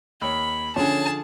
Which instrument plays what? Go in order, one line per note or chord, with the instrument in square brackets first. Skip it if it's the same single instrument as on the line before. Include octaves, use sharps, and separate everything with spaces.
[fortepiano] D#2 C#5 [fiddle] B5
[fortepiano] D3 F3 [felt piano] C#4 [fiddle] G#4 A5